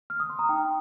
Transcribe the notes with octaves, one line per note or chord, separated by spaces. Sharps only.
F6
D#6
C6
A#5
D#4 G5